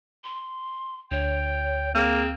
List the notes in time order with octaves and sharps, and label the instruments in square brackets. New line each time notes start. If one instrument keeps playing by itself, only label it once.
[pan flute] C6
[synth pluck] D2 [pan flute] C#5 [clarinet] G5
[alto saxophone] A#3 [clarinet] C4 [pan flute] G#4